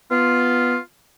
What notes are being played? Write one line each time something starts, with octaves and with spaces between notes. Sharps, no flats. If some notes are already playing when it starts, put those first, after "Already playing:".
B3 F4